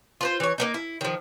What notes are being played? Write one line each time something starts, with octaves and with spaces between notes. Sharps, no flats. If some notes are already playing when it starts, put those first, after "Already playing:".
F4 B4 C5
E3 C#5
A#3 B3 D#4
E4
D#3 F3